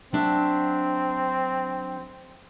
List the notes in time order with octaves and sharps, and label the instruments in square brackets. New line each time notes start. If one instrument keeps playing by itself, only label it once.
[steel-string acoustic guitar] F#3 D4 E5 [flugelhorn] C4